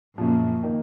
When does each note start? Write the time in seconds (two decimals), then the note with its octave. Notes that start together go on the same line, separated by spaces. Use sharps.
0.18 F#2 A#2 C#3 F3
0.63 D#3 A#3